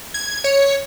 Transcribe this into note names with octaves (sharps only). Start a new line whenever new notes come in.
G#6
C#5